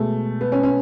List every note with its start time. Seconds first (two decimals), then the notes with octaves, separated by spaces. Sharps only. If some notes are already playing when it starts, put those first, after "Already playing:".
Already playing: B2 G#3 A3
0.41 B3
0.52 C#4
0.63 C#4